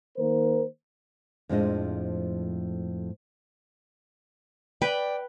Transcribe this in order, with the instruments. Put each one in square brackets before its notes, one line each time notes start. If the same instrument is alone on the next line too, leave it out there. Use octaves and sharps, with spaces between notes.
[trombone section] D#3 A#3 A#4 C5
[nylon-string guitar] F2 A2 F3 G#3 D4 D#5
[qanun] B4 [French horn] D5 [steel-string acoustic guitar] G5